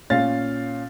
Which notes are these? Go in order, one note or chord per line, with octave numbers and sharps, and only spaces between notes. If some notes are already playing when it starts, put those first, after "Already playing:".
A#2 C#4 F5 A6